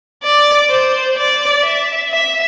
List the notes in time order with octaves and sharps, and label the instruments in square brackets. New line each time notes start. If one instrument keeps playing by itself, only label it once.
[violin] D5
C5
D5
E5
E5